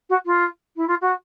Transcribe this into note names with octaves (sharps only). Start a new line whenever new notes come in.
F#4
F4
E4
F4
F#4